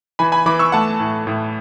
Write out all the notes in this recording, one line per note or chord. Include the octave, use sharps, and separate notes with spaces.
E3 G#5 B5
G#5 B5
E3 B5 D6
C#6 E6
A3 F#5 A5
A2
A2